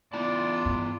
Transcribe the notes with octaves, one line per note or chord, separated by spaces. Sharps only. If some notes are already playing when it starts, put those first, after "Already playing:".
B3 E4 F4 D5 A5
G2